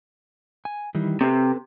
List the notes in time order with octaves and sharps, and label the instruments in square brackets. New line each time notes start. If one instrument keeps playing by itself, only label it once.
[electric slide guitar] G#5
D#3 E3 G3
[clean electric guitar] C3 [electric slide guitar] C4 A4 B4